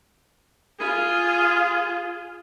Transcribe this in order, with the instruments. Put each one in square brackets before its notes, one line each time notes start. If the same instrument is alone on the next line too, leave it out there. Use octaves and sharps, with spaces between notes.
[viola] F4 G#4